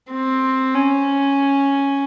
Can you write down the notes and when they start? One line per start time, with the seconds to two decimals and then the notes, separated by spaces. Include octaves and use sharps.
0.11 C4
0.74 C#4